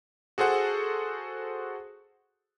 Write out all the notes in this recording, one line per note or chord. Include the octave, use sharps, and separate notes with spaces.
F#4 G#4 A4 C5 F#5